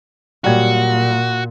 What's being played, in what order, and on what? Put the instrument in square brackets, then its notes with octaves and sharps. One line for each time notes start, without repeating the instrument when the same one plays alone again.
[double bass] A#2 [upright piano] F#3 G3 G#6 [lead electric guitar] F#4